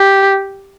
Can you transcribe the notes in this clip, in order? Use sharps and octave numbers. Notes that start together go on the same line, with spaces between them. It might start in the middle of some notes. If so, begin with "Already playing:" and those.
Already playing: G4